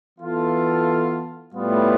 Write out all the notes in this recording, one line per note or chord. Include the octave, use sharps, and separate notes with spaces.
E3 B3 F4 A4
A2 G3 B3 F4